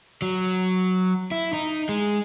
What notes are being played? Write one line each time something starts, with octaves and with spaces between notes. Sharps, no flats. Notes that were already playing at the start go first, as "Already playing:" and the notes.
F#3
E4
D#4
G#3